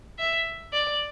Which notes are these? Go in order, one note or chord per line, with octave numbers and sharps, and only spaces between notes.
E5
D5